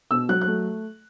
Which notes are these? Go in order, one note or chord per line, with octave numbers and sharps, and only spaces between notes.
B2 E6
F#3 F#6
F#6
A3